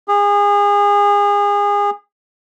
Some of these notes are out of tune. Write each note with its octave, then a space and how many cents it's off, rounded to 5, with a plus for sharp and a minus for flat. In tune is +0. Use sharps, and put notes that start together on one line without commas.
G#4 -30